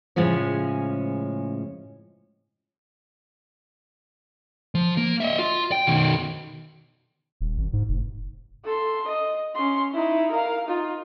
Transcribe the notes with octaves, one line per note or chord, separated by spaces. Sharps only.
A2 C#3 F3 G#3 C#4
F3
A#3
D#5 E5
F4
G5
B2 D#3
D#1
G#1
G#2
F1
A4 C6
D#5
C#4 C6
D#4 E4
A#4 F5
D#4 F4